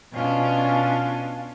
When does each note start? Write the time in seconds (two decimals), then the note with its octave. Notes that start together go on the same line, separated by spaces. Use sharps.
0.13 B2 C#4 D4 F4